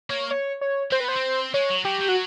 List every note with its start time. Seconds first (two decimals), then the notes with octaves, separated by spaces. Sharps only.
0.10 A#3 C#5
0.31 C#5
0.61 C#5
0.92 C4 C5
1.00 B4
1.04 B3 C5
1.16 C4
1.54 G#3 C#5
1.70 F#3
1.85 F#3 G4
2.01 F#3
2.09 F#4